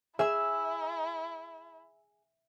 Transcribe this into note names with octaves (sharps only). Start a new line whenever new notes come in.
E4 G#4 E5 E6